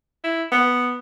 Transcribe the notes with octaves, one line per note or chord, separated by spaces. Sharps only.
E4
B3